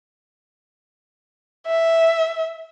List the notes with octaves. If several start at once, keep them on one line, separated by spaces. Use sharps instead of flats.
E5